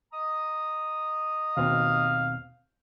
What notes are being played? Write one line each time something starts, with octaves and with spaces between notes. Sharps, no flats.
D#5 A#5 D#6
D#2 B2 C4 F5